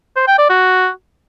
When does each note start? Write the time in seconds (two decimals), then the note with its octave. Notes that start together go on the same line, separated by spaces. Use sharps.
0.16 C5
0.27 G5
0.38 D5
0.49 F#4